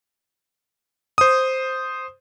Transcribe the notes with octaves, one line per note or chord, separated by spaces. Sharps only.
C5 D#6